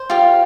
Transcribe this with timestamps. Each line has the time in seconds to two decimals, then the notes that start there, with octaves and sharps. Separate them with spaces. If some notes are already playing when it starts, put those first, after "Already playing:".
Already playing: C5
0.10 F4 G4 F5